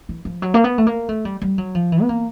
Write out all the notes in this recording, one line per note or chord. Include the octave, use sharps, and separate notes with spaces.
E3
F3
F#3
A#3
B3
A3
A#3
A3
G3
G3
F#3
F3
E3
B3
A#3